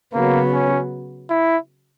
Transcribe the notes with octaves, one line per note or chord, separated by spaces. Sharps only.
C#3 F#3 A#3 B3
C#4
E4